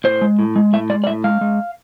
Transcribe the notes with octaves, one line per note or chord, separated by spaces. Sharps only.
A2 C5
G#3
A2
G#3
A2 E5
G#3 D5
D5
A2 E5
G#3 F5
G#3